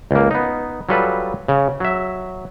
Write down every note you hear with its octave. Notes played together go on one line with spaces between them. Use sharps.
C#2 A#3
B3 D#4
F#3 G3 F4 A4 B4
C#3
F#3 E5